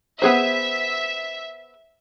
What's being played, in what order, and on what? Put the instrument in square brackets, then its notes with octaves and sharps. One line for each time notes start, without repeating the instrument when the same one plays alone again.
[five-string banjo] B3 G#4 C5 [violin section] E5